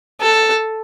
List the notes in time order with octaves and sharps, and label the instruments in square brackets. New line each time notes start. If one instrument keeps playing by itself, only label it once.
[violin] A4